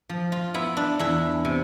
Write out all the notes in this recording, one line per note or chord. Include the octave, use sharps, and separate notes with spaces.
F3
F4
B3 E4
D4
E2 E4
C3